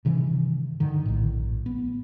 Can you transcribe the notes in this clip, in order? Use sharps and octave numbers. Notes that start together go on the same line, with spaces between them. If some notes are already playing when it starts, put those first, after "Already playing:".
G2 C3 D#3 E3
G2 D3 D#3
A#1 A2
B3